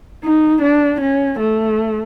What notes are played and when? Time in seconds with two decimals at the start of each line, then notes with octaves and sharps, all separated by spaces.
0.24 D#4
0.62 D4
1.00 C#4
1.39 A3